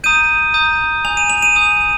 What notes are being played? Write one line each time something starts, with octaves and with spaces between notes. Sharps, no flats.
A#5 D#6 G6 D#7
A#5 D#6 G6
G#5 D#6 G6 F7
D#7
F7
D#7
G#5 D#6 G6